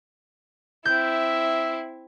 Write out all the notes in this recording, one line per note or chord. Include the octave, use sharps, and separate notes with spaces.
C4 E4 E5 G6